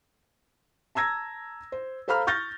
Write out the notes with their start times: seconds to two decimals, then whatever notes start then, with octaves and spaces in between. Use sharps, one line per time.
0.95 A5 A#5 E6 G#6 A#6
1.72 C5
2.08 A4 C5 F5 A#5 B5 F6
2.27 C#6 F6 G6 A6 A#6